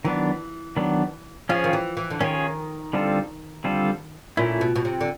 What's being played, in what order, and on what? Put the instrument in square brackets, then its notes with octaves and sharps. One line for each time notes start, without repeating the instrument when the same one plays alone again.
[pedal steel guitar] D#3 F#3 B3 D4 [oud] E3
[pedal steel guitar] D#3 F#3 B3 D4
[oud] F3 [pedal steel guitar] C#4 F4 G#4 C#5
[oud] D#3
E3
E3
D3
[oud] D#3 [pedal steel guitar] C#4 F4 G#4 C#5
[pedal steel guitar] D3 G3 C4 F4 A4
D3 G3 C4 F4 A4
[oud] A#2 [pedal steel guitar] A3 C#4 E4
[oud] B2
B2
C3
D3